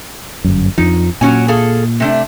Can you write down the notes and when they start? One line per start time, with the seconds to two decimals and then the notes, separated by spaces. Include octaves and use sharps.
0.44 G1 F#2
0.78 F2 F3 D#4
1.21 A#2 F#3 C#4 G#5
1.48 G#4 A4 F5
2.00 C3 A3 D4